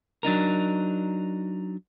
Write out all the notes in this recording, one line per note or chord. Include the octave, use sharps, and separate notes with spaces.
F#3 D4 D#4 A#4